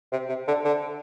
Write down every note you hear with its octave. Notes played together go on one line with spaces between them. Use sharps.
C3
C3
D3
D3